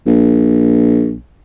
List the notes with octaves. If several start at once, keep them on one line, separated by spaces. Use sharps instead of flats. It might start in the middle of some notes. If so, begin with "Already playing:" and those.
A#1